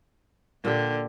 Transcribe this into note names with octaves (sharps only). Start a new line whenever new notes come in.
A#2 D3 G4 G5